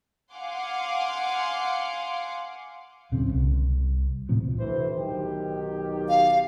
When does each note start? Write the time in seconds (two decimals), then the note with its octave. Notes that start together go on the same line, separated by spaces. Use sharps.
0.34 F5 F#5 G#5 C6 D6
3.12 D1 B1 C#3 C4
3.33 C2
4.29 D#1 A2 C3 F3
4.58 D2 E3 C5
4.96 B1 D#3 G4
6.09 F5